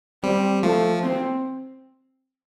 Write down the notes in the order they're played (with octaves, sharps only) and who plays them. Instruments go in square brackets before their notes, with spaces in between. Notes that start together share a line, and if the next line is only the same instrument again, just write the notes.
[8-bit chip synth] G3 [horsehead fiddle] C4
[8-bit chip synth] F3 [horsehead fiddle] A3
[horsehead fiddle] C4